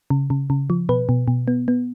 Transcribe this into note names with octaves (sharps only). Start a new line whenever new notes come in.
C#3
C#3
C#3
F3
B2 B4
B2
B2
B3
B3